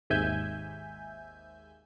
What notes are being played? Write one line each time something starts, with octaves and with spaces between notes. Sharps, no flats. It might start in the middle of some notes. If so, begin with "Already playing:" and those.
G#1 D#2 G#2 E5 G#5 G6